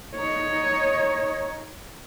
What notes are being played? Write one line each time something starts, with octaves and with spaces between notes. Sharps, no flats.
D#4 C#5